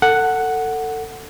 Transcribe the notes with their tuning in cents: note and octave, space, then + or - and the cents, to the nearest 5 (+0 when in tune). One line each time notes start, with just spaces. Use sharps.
A4 +25 F#5 +0